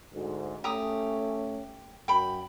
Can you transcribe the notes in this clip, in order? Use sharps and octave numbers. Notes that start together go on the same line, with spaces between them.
D2 G#2
A3 C#4 G4 A#5 D#6
F#2 G5 B5